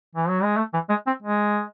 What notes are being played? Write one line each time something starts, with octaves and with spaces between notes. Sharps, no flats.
E3
F#3
G#3
A3
E3
G#3
C4
G#3